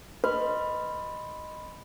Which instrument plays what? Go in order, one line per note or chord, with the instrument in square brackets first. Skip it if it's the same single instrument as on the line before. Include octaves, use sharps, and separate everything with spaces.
[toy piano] B4 [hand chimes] D#5 B5 C6